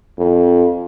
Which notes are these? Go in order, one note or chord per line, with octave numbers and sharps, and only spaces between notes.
F2